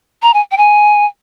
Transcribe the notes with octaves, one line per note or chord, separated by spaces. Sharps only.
A#5
G#5
G5
G#5